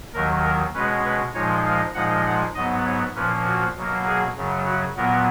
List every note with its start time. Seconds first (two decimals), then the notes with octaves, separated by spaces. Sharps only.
0.14 D#2 D#3 F#3 A#4
0.43 A#4
0.74 B2 G#3 C#4 B4
1.04 B4
1.34 A#2 F3 G#3 D#4 C#5
1.65 F5
1.94 A#2 F3 G#3 D#4 F#5
2.26 F#5
2.55 G#2 F#3 B3 D#5
2.86 C#5
3.15 A#2 F3 A#3 C#4 B4
3.46 F#4
3.76 B2 F#3 A#3
4.06 G#4
4.36 F#2 C#3 F#3
4.66 F#4
4.97 A#2 F#3 B3 A#4